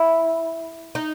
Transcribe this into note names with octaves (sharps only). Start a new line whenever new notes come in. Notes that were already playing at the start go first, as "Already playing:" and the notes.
Already playing: E4
D#4